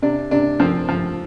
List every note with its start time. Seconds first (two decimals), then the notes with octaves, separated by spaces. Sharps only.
0.02 C3 D4
0.31 C3 D4
0.59 F3 C4
0.89 F3